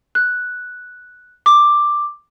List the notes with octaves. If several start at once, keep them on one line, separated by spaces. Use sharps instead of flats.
F#6
D6